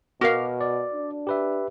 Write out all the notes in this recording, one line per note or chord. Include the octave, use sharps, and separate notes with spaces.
B2 F#4 A#4 F5 D6 F6
D5
D4
G4 B4 E5